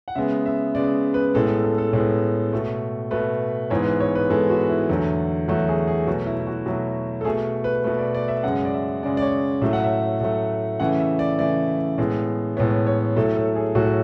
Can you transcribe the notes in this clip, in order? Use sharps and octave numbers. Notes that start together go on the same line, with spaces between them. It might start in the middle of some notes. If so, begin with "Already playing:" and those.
F#5
C#3 G#3 B3 E5
E5
C#3 G#3 B3 D5
B4
A2 G#3 B3 A4
A4
A4
A4
A2 G#3 B3
B2 A3
B2 A3 B4
G#2 E3 G#3 B3 C#5
B4
C#5
B4
G#2 E3 G#3 B3 A4
F#4
E4
E2 D3 F#3 A3
E2 D3 F#3 A3 F#4
G#4
G#4
B2 F#3 A3 F#4
E4
E4
F#4
B2 F#3 A3
A4
B2 A3 G#4
B4
B2 A3 B4
D5
D5
E5
F#2 C#3 G#3 F#5
D5
E5
F#2 C#3 G#3 D5
D5
C#5
A2 F#3 A3 E5
F#5
E5
A2 F#3 A3
C#3 E3 A3 F#5
E5
D5
C#3 E3 A3 D5
A2 G#3 B3
A2 G#3 B3 C#5
C#5
A2 F#3 A3 A4
A4
G#4
A2 F#3 A3 F#4